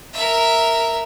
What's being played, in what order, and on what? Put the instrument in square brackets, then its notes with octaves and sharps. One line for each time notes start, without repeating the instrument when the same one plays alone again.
[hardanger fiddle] A#4 E5